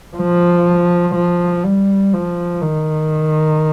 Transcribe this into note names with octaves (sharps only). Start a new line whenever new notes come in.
F3
F3
G3
F3
D#3